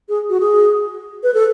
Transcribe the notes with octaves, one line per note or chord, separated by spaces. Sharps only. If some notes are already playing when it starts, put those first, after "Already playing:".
G#4
F#4
G#4
B4
A4